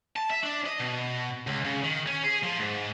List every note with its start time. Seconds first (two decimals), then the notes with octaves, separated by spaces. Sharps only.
0.16 A5
0.30 E5
0.43 D4
0.66 D#5
0.80 B2
1.47 C#2
1.64 C#3
1.83 D#3
2.07 C#4
2.24 G#4
2.43 F3
2.58 G#2